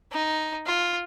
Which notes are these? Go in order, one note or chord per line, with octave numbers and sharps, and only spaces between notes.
D#4
F4